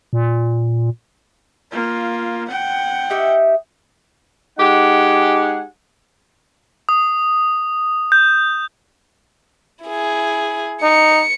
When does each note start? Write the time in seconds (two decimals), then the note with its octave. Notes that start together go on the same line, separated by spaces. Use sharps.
0.13 A#2
1.72 A#3 F4
2.49 F#5 G5
3.10 D#4 G4 E5
4.59 G#3 D#4 G4 G#4 F#5
6.89 D#6
8.12 G6
9.84 E4 G#4
10.82 D#4 C#7